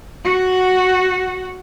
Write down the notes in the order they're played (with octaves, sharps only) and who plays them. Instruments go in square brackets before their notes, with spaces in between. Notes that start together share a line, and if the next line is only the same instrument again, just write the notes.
[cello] F#4 F#5